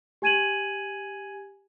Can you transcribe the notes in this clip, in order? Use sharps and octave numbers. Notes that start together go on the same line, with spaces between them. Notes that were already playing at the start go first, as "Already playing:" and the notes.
G4 G#5 G#6 D#7 E7 F#7